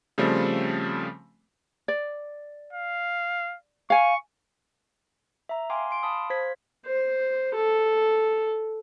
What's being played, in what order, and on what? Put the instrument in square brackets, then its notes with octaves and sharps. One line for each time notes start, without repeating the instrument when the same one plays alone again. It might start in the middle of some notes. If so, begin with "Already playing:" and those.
[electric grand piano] C#3 F3 G3 A3 C4
[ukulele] D5
[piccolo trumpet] F5
[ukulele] F5 G#5 [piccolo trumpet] C#6
[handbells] E5 A#5
F5 G5 G#5 C6 D6
C6 D7
F5 A5 B5 D#6
C5 F5 G#6 B6
[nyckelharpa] C5
A4